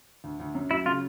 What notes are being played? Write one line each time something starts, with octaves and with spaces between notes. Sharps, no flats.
D2
D2
F#2
F#3 E4
C#3 F4